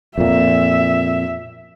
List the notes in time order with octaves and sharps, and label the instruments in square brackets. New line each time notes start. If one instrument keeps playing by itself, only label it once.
[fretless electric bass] F2 A#2 [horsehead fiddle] E5